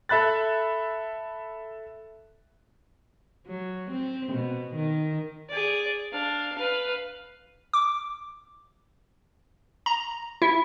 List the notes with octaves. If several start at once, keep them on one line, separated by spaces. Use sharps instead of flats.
A4 E5 B5 F#6 A6
F#3
C4
B2
D#3
G#4 D5
D4 F5
B4 F5
D6
A#5
E4